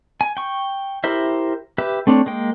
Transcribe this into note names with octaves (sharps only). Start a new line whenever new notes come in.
G#5
G5 C#6
E4 G4 A#4 C5 E5
G4 B4 E5
A3 C4 D4 C#5
G#3 A#3 G5